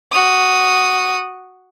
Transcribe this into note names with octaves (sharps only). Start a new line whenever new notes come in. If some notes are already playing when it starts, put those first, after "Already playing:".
F#4 D#6